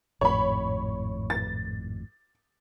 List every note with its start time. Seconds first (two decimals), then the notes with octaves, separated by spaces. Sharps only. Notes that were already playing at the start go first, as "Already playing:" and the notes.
0.21 G#1 F2 A2 C#5 B5
1.30 A6